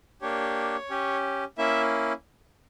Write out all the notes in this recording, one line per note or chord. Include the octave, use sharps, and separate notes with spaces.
A#3 D4 G4 C#5
C#4 G4
A#3 C#4 E4 E5